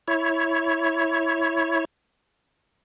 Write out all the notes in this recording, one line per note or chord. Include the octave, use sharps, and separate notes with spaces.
E4 C#5